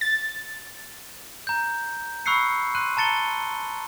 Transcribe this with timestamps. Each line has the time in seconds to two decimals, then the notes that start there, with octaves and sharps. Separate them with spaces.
0.01 A6
1.47 A#5 G6
2.26 B5 C#6 E6 F#6 C7 C#7
2.75 C6 F#6 D#7
2.97 A5 A#5 A6 C#7 G7